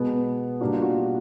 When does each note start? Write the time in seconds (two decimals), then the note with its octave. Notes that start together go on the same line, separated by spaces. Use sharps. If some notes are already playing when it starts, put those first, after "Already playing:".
Already playing: B2 G#3 B3
0.61 B2 G3 A#3 D4 F#4
0.72 F4
0.82 F#4
0.96 F4